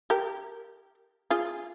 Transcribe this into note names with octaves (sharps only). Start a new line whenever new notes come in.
G4 A#4
F4 G#4